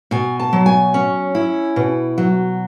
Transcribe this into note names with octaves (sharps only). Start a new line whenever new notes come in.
B2 G#5
A5
F#3
G#5
C#4
E4
B2
F#3